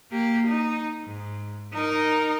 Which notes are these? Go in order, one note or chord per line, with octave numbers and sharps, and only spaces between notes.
A#3 G4
D#4
G#2
D#4 A#4